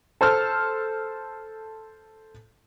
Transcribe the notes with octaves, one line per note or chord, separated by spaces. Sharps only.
A4 C5 A5 F6